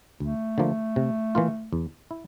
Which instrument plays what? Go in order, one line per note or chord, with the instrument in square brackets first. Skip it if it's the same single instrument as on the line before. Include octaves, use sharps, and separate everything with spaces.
[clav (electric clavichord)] D2 [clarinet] A3
[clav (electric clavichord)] D3 F3 A#3
C3
E3 A#3 F4
E2
E4